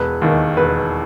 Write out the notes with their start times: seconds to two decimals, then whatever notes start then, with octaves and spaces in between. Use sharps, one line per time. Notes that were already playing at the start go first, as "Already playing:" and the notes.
Already playing: E1 B4
0.22 D#2 D#3
0.57 E1 B4